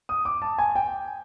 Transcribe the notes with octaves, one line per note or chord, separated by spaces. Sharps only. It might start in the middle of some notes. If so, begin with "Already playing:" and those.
D#6
D6
A5
G#5
G5